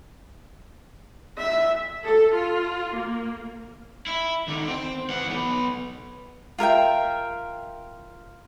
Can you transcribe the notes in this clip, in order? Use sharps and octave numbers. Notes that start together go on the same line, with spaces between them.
E5
A4
F4
A#3
E4 E5
D3 D#3
C4 G5
E3 F#5
B1 B3
F4 A#4 E5 G5